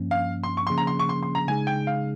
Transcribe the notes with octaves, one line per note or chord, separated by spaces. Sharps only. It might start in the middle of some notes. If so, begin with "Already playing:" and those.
Already playing: G2 F3 A#3 C#4
F5
C6
C#6
C#3 F3 A#3 C#4 G#4 C6
A#5
C6
C#6
C6
C6
A#5
C#3 G#3 D#4 G#4 G#5
G5
F5